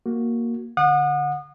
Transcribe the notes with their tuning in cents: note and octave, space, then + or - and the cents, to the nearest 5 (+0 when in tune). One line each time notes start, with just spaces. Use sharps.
A#3 +0 F#4 +0
D3 +0 F#5 -30 D#6 -35